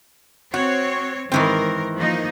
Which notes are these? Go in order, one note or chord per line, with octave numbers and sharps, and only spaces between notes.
C4 F#4 C#5
G#2 D#3 E3 C4 A#4
F3 A#3 D#4